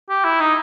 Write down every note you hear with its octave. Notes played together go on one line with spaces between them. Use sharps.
G4
E4
D#4